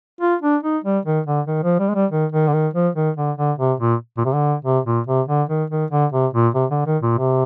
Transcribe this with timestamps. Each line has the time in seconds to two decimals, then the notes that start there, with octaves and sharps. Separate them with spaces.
0.21 F4
0.42 D4
0.63 D#4
0.84 G3
1.05 D#3
1.26 D3
1.47 D#3
1.63 F3
1.79 G3
1.89 G#3
1.95 G3
2.11 D#3
2.32 D#3
2.47 D3
2.53 D#3
2.74 F3
2.95 D#3
3.17 D3
3.37 D3
3.59 C3
3.80 A#2
4.17 A#2
4.25 C3
4.33 D3
4.64 C3
4.85 A#2
5.07 C3
5.28 D3
5.49 D#3
5.70 D#3
5.91 D3
6.12 C3
6.33 A#2
6.54 C3
6.70 D3
6.86 D#3
7.02 A#2
7.18 C3